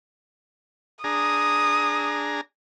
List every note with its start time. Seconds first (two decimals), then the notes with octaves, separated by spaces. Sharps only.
1.04 D4 G#4 A#5 D#6